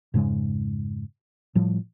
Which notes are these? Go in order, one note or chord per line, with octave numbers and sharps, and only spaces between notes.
F2 G#2 C#3 G#3
A2 F3 G3